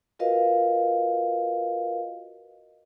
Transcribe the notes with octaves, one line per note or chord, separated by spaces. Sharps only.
F4 F#4 A#4 B4 D#5 F5